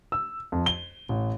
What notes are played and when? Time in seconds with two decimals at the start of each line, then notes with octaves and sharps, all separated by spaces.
0.12 E6
0.52 F2
0.66 G7
1.09 A1